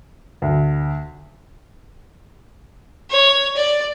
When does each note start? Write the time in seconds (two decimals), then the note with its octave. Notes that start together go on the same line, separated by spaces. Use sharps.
0.42 D2
3.11 C#5
3.56 D5